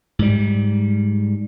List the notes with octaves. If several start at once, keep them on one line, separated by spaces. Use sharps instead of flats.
G#2 G3